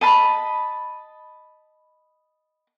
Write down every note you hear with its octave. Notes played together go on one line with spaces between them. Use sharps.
D#5 A5 B5